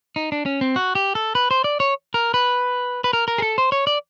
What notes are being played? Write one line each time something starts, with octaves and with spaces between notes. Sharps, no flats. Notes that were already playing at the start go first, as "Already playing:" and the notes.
D#4
D4
C#4
C4
F#4
G4
A4
B4
C5
D5
C#5
A#4
B4
B4
A#4
A#4
G#4
A4
C5
C#5
D5